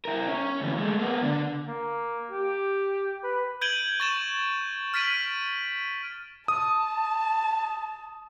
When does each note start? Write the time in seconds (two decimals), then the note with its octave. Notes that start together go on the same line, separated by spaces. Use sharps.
0.05 E4 A#4
0.28 C#4
0.60 D2 E3
0.78 G#3 A3
1.00 A#3 B3
1.23 D3
1.67 A#3
2.31 G4
3.24 B4
3.61 G6 G#6 D7 D#7 F#7 G7
4.00 C#6 A6 E7
4.94 F6 A6 B6 D7 D#7 F#7
6.48 A5 D#6